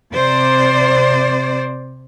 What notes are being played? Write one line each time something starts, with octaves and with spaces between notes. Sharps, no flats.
C3 C5 D5